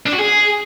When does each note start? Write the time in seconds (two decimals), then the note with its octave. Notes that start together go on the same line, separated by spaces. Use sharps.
0.06 D4
0.13 F#4
0.19 G#4